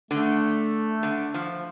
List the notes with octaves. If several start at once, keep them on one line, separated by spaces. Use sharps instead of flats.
D3 A3
D3
F3